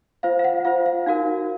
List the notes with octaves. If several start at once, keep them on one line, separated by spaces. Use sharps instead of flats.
F4 C5 F5
F5
F#5
F4 C5 F5
F5
D#4 F#4 A#4 F5